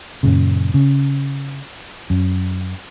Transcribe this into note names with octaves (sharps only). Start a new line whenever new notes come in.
F#2 A#2 C#3
C#3
F#2